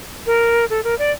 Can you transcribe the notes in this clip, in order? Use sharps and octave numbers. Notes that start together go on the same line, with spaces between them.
A#4
A4
A#4
D5